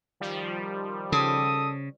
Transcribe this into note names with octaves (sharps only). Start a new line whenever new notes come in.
D#3 F3 G3
C#3 A4 D#6